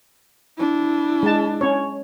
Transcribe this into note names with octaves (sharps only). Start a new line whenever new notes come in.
D4 E4
G#3 A5
C#4 C#5